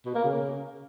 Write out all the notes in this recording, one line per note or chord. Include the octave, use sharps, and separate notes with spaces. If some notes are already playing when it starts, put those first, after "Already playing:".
B2
A#3
C#3